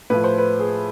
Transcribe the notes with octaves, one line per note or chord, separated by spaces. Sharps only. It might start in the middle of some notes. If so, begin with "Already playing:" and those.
A2 F3 B4
C5
B4
G#4